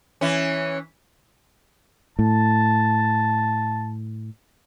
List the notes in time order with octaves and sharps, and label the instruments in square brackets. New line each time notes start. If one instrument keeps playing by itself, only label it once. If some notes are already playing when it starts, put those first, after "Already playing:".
[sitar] E3 C#4
[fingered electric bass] A2 [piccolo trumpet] A5